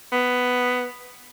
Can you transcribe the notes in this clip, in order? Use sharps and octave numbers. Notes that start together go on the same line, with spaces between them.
B3